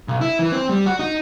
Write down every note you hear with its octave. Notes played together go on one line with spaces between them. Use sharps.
B1
E4
E3
C4
G3
F#4
D#4